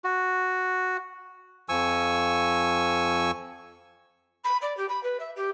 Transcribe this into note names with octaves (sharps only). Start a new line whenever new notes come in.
F#4
F2 F3 G#5 C#6 E6
B5
D5
G4
B5
B4
E5
G4